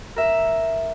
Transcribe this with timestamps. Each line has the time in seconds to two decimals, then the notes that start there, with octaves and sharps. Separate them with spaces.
0.16 A#4 E5